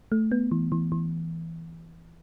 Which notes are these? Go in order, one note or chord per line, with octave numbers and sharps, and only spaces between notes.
A3
B3
E3
E3
E3